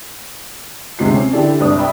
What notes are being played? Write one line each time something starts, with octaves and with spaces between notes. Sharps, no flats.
D2 C3 G#3 F4 C7
C4 C#4
D3 E3 E4 G4 A4 D5
G1 C2 D4 D#6
D5 E5 G5 B5 D#6